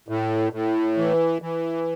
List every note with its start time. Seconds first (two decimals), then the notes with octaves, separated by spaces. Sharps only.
0.09 A2
0.53 A2
0.97 E3
1.42 E3